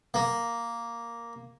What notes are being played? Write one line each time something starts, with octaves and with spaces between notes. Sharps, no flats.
A#3